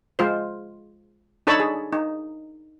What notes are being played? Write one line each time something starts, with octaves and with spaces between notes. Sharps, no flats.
G#3 F4 C5
D4 D#4 A4 C#5 A5 B5
G#4
D#4